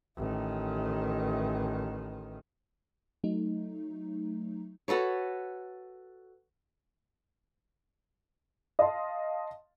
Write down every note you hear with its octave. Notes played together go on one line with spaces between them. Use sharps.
A1 D#3
F#3 A3 D#4
F#4 A4 B4 C#5
D#5 F5 A5 C6